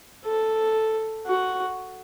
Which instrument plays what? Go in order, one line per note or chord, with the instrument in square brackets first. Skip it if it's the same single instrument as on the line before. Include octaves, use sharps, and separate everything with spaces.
[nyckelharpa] A4
F#4